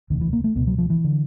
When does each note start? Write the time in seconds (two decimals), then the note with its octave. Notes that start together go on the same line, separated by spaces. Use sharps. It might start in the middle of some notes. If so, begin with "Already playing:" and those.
0.10 E1 D2 C3 D#3
0.21 E3
0.33 A#3
0.44 A3
0.55 C#2 B2 B3
0.67 F#3
0.78 F3
0.90 E3
1.04 D3